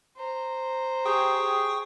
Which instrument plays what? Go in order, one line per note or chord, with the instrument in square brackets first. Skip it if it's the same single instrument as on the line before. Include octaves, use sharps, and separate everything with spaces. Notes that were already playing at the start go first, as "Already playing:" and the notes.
[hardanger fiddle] C5 A#5
[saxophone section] G4 G#4 [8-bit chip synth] G5 C#6 D#6